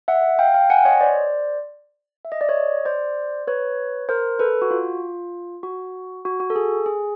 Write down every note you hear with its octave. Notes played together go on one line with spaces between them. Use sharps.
E5 F#5
F5 G5
F5 G5
F#5 G#5
C#5 D#5
C5 D5
E5
D#5
D5
C#5 D#5
C5 D5
B4 C#5
A#4 C5
A4 B4
F#4
F4
F#4
F#4
F#4
A4
G#4
G#4